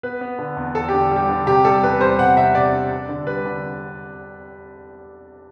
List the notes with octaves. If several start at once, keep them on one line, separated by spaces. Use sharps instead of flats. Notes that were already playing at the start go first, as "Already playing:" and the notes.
B3 B4
B3
D3
E2
E2 A4
D3 G4
G3
G4
D3
C3 G4
G3 A4
E2 B4
G3 C5
C3 F#5
C3 E5
C3 D5
D4
D4
D3
G3 B4
D3